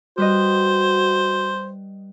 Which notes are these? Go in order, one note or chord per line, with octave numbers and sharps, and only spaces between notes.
G3 F#4 B4 C5 D#5